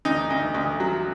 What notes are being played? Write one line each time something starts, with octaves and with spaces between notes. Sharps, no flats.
D2 D#4
D2
D2
F#3